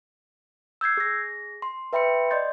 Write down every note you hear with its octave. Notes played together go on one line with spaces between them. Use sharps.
E6 G6 G#6 C7
G#4 A#6
C6
B4 E5 G5 B5 C6 C#7
D5 D#5 C6 G6 A6